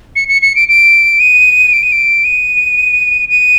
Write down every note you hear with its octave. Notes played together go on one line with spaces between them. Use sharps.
C#7
C#7
C#7
D7
D7
D#7
D7
D#7
D7
D#7
D#7